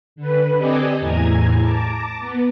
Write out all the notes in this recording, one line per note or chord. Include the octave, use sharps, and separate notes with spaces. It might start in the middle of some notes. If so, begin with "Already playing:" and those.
D3 B4
C4 G4 A4 D5 D#5 G#5
E2 A2 G#5 A#5 G#6
A5 A#5 D6
B3